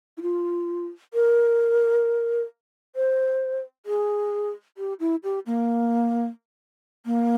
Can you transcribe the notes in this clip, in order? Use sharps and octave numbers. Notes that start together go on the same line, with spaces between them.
E4
F4
A#4
C5
G#4
G4
E4
G4
A#3
A#3